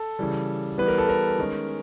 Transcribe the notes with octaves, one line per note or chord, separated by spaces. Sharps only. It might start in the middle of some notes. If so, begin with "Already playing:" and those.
Already playing: A4
C#3 E3 G3
E3 G3 B3 B4
A#4
A4
A#4
D#3 G#3 C#4